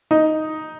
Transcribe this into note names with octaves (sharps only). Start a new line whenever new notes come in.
D#4 D#5